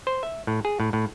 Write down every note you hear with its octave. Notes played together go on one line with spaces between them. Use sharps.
C5
E5
A2
G#4
A2
A2